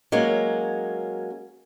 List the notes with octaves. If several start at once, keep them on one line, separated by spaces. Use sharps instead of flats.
F#3 G#3 A#3 C#4